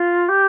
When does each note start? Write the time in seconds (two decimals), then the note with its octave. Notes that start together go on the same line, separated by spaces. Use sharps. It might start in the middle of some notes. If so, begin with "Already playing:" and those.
Already playing: F4
0.28 G4